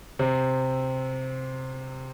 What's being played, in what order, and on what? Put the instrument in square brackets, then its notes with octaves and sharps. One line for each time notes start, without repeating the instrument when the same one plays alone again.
[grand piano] C3 C4